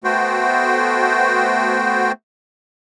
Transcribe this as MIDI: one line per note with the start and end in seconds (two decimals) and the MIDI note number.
0.04 2.12 57
0.04 2.12 59
0.04 2.12 66
0.04 2.12 72
0.04 2.12 79